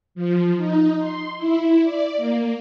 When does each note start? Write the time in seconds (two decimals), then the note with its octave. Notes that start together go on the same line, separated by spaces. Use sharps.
0.15 F3
0.57 D#4
0.99 C6
1.37 E4
1.84 D5
2.17 A#3